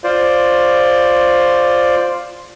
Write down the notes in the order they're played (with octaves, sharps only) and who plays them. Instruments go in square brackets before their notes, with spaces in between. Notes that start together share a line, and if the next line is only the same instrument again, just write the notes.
[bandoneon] F4 C5 D5